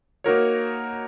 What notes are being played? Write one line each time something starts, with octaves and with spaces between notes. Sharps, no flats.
A#3 D#4 F#4 A#4 C#5